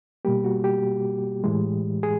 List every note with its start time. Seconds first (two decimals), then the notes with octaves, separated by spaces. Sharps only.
0.25 B2 G3 A#3 G4
0.44 F#4
0.64 G4
1.44 A2 E3 G#3
2.03 G#4